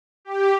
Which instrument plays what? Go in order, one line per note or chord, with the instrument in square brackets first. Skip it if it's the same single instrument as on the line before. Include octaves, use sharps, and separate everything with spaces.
[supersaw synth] G4